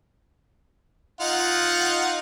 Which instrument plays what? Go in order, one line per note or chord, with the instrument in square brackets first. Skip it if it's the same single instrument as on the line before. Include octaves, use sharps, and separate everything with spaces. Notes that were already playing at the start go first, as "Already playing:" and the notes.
[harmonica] D#4 F4 F#5